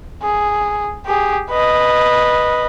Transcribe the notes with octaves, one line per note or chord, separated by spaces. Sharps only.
G#4
G4 G#4
B4 D#5